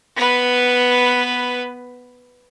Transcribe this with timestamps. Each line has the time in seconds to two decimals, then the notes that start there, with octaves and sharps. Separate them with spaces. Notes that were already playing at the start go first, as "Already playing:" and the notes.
0.16 B3 B4